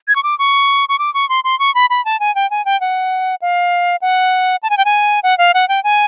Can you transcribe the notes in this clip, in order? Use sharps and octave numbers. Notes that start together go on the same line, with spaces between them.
G#6
C#6
D6
C#6
C#6
D6
C#6
C6
C6
C#6
B5
B5
A5
G#5
G5
G#5
G5
F#5
F5
F#5
A5
G#5
G5
G#5
F#5
F5
F#5
G5
G#5